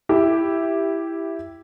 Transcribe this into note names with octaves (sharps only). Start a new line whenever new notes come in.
E4 G4